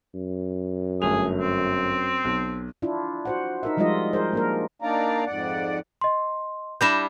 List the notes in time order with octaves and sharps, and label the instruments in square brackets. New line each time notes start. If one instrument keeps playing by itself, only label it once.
[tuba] F#2
[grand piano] G1 A3 F7 [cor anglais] G#4
[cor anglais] C4
[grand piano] B1
[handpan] D4 E4 F4
F#4 C5 F#5
D#4 A#4 E5
F3 G3 G#3 D#4 F4 D#5
G#4 A#4 C5
A#3 D4 A#4
[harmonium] A#3 D4 D#4 D5 F5 A#5
F2 G#2 D5 F#5
[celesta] D#5 C6
[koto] G3 D4 E4 [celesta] G6 A#6 E7